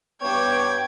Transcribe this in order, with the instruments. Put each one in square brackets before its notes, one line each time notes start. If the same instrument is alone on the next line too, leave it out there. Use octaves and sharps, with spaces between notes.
[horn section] G2 B3 C#5 [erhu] G5 [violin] D6 G#6